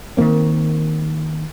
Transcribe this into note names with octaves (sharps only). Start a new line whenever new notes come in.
D#3 E3 A#3 C4